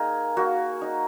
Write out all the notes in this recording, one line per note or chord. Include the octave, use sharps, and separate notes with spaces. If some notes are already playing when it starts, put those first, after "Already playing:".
Already playing: A#3 D#4 G#4 A#4
A#3 F#4
D#4